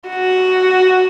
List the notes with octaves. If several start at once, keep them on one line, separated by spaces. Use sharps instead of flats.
F#4